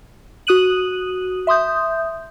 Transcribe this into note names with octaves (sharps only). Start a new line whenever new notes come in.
F#4 D#6 F#6 D#7 F#7
E5 C6 D#6 G6